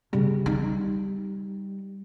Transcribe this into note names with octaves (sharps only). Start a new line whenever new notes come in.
C#3 G3
D#4